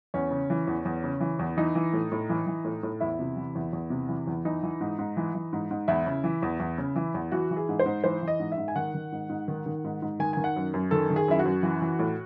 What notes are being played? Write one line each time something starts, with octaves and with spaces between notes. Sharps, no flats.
E2 C#4
C#3
E3
E2
E2
C#3
E3
E2
E3 D#4
E3
A2
A2
E3
E3
A2
A2
E2 E4
C3
E3
E2
E2
C3
E3
E2
E3 D#4
E3
G#2
G#2
E3
E3
G#2
G#2
E2 E4
C#3
E3
E2
E2
C#3
E3
E2
E3 F#4
E3
G#4
G#2
C5
G#2
E3 C5
E3 D#5
G#2
E5
G#2
G#5
D#3 F#5
D#3
G#2
G#2
D#3
D#3
G#2
G#2
D#3 G#5
D#3 G#5
F#5
F#2
F#2
D#3 A4
D#3
G#4
F#2 E4
F#4
F#2
E3
E3
A2